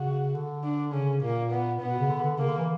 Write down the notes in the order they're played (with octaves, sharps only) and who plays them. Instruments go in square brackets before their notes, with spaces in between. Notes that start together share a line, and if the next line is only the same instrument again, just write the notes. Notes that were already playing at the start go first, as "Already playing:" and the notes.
Already playing: [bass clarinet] C#3 [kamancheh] F#4
[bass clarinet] D3
[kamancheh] D4
[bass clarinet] C#3 [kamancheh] C#4
[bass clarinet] A#2 [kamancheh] A#3
[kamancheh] B3
[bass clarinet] A#2 [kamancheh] B3
[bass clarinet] B2
C#3
D3
D3
[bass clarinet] C#3 [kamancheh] A#3
[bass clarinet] D3
E3